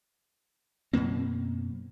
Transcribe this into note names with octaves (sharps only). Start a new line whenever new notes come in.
F#2 B2 A#3 C4